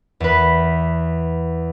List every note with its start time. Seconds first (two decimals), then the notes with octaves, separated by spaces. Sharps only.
0.20 E2 B4